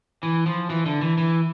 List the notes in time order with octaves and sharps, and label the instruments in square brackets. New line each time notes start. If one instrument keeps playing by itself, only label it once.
[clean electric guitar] E3
F3
E3
D3
E3
E3